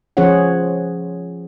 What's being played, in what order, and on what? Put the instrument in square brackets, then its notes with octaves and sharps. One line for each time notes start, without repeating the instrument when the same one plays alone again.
[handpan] F3 C#4 G#4 C5 C#5 F#5